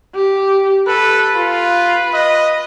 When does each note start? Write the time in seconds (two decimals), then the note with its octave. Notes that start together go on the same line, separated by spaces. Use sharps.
0.15 G4
0.87 A4 B4
1.36 F4 B4
2.14 D#5